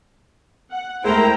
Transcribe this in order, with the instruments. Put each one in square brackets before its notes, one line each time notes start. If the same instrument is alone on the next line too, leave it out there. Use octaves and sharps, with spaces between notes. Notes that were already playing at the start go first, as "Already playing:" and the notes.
[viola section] F#5
[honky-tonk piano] G#3 A3 [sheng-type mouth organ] E4 C5 [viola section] A#4 G5 A#5